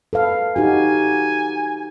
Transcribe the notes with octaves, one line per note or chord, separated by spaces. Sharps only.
A4 B4 F5
D#4 F#4 G4 G#5